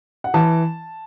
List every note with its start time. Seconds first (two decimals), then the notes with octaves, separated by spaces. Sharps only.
0.24 F#5
0.34 E3 A5